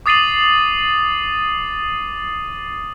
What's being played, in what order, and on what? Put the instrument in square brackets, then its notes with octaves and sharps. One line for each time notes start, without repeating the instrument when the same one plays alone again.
[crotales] D6 D#6 A6 C7 D#7 F#7